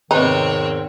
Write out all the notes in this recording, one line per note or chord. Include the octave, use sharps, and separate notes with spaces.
E2 G#2 C3 D#3 C4 D#4 B4 C#5